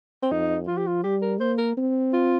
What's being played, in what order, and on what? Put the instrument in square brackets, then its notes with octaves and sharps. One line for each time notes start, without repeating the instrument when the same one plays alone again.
[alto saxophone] C4
[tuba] F2 [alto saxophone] D#4
[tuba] F3 [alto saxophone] F4
[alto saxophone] G4
F4
[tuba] G3 [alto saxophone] G4
[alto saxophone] A#4
[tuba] A#3 [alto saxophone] C5
[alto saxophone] A#4
[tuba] C4
[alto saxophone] F4